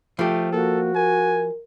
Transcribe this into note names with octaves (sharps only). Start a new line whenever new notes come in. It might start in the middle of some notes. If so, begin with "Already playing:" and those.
F3 A3 G4
A#3 F#4 A4
A#4 G#5